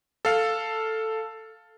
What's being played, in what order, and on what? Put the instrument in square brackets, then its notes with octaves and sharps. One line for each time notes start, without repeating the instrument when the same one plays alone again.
[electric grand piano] A4 F5